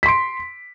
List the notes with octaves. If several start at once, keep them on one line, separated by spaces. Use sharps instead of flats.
C6 B6 D7